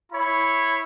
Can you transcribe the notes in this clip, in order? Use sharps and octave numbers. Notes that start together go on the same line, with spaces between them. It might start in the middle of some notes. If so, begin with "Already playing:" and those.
E4 C#5 B5